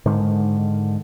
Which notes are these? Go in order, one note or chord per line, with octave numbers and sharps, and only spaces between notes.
G#2 D3 D#3